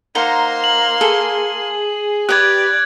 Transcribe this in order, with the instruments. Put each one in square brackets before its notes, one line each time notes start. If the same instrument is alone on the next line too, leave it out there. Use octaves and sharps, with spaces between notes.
[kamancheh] A#3 C6 [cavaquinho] D#4 C5 F#5 [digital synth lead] A#5
[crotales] F#7
[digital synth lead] G#4 [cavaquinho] A4
[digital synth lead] G4 [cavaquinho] B4 D#6 [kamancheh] D5 [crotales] F#6 G#6